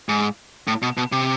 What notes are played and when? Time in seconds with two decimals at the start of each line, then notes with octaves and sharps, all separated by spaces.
0.09 G#2
0.67 A2
0.82 B2
0.97 B2
1.12 C3